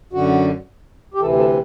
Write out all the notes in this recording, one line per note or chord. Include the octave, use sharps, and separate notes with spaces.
F#2 D3 F#4
G4
D2 C3 E3 A4
A4